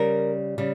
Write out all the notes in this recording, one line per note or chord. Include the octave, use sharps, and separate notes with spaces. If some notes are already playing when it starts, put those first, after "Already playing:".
Already playing: C#3 G3 A#4
C#3 G3